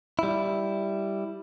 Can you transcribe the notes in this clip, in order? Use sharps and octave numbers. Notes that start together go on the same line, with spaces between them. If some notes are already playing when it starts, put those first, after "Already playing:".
G3 E4